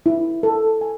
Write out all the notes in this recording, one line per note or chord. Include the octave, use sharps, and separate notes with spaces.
E4
A4
G#5